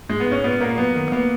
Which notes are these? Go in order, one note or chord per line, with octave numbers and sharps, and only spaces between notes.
G#2 G#3
B3
G#2 C#4
A#2 B3
A#2 A#3
F#2 B3
D#3
A#3 B3